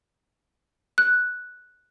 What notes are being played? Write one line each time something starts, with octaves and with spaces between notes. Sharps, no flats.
F#6